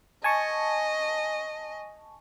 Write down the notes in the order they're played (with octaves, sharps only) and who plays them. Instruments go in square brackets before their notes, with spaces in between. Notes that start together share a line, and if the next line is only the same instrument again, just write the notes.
[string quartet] D#5 [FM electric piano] G#5 A5 C#6